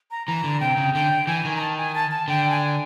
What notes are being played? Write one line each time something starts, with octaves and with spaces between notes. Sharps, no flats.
A#5
E3 A#5
D3
C3 G5
C#3
D3 G5
E3 G#5
D#3
A#5
A5
G#5
A5
A5
D3 G5
G#5